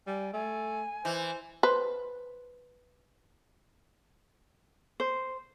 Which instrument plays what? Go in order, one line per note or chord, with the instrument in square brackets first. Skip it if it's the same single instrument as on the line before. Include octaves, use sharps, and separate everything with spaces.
[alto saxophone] G3 [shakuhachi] G#5
[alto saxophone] A3 [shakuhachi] G#5
[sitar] E3 [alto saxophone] C5
[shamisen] B4 C5
[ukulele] C5